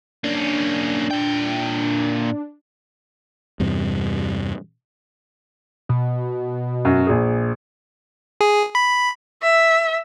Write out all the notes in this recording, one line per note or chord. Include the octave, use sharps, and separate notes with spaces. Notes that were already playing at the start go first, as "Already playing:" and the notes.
A#3 C#4 D4
A#2 G5
E2 G2 C3
B2
F#2 F#4
A#1 G#4
G#4
B5
E5